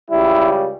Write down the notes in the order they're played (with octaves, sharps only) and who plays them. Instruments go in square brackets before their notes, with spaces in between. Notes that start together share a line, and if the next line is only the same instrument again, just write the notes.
[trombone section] C#2 C#3 G3 E4